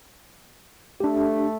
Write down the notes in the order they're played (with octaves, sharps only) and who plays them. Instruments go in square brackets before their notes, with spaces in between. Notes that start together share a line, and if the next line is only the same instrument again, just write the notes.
[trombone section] A3 [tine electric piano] D4 G4